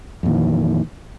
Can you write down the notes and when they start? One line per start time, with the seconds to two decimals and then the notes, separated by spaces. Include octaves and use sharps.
0.23 F2
0.26 A#2
0.28 D#3
0.31 E3